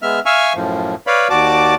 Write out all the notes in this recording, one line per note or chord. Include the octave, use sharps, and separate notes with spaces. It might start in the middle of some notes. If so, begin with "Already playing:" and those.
G#3 B3 E5 F6
E5 F5 G#5 C#6 E6 F6
F#2 A2 F3
B4 C#5 D5 F5 B5
D#2 F#4 D5 A5 D6